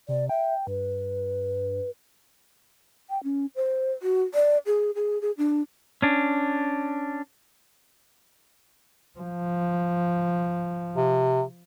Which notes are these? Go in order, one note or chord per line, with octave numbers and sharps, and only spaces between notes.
C3 D5
E5 G5
G2 B4
G5
C#4
C5
F#4
D5
G#4
G#4
G#4
D4
C#4 D4
F3
C3